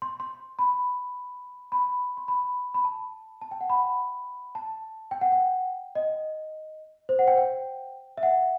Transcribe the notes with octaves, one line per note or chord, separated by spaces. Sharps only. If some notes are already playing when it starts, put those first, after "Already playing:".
C6
C6
B5
B5
C6
B5
B5
A5
A5
G5
F#5
B5
A5
G5
F#5
G5
D#5
C5
F#5
G5
G5
E5
F#5